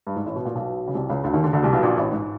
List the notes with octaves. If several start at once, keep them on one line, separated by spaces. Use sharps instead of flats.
G2
G#2
A1 A2
B2
A#2
B1 B2
C#3
C2 C3
C#2 C#3
D2 D3
D#2 D#3
D2 D3
D2 D3
C2 C3
B1 B2
A#1 A#2
A1 A2
G#2